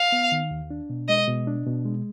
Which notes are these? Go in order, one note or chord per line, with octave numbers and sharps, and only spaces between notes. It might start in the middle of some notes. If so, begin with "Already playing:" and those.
Already playing: F5
B3
D#3
D#2
D4
B2
G#3 D#5
B2
D4
B2
G#3